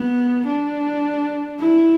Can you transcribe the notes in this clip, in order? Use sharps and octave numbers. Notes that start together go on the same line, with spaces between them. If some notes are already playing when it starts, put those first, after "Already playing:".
Already playing: B3
D4
E4